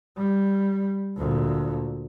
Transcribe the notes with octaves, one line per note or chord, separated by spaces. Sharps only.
G3
D2 A#2